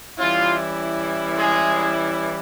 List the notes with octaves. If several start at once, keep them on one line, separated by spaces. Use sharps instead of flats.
E3 G3 C#4 E4 F4
G#3 G#4